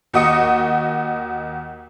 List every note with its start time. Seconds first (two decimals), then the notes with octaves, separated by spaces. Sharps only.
0.14 D#2 F#4 D#5 D#6 C#7